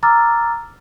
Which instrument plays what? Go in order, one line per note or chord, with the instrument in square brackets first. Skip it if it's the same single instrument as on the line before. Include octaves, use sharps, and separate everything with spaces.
[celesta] A#5 D6 E6 F6 A6